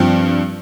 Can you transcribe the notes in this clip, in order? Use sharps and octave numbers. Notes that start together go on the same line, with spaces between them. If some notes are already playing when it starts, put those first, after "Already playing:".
Already playing: G2 F3 C4